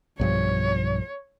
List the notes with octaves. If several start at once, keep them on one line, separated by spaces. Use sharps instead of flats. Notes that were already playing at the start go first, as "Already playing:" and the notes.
B1 G2 F3 C#5